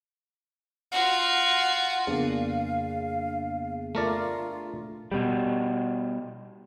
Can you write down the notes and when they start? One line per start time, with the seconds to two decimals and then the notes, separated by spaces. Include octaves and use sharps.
0.92 F4 F#4
2.07 F2 C#3 A#3 B3 D4 G#4 F5
3.95 A3 F4 A#4 D5
5.12 B2 G3